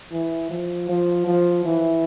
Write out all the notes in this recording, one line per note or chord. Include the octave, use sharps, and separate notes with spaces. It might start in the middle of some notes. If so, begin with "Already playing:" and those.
E3
F3
F3
F3
E3